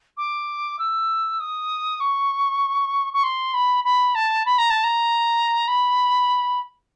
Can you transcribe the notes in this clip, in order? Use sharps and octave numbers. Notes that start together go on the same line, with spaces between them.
D6
E6
D#6
C#6
C#6
C6
B5
B5
A5
B5
A#5
A5
A#5
B5